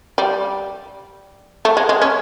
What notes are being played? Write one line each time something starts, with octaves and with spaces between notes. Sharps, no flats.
G3
A3
G#3
G#3
C#4